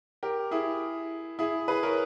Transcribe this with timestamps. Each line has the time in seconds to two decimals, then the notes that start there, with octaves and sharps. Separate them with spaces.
0.23 G4 A#4
0.51 E4 G#4
1.39 E4 G#4
1.68 G#4 B4
1.83 A#4 C#5